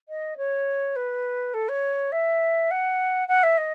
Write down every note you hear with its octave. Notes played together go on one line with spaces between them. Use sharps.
D#5
C#5
B4
A4
C#5
E5
F#5
F#5
E5
D#5